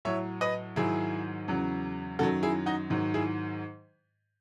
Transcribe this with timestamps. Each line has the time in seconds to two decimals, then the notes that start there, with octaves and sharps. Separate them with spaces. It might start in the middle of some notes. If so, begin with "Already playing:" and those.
0.05 A2 F#3 C#5 E5
0.41 B4 D#5
0.76 G#2 D#3 F#3 E4 G#4
1.48 E2 C#3 F#3
2.19 F#2 D#3 F#3 F#4 A4
2.43 E4 G#4
2.66 D#4 F#4
2.90 G#2 D#3 F#3
3.14 E4 G#4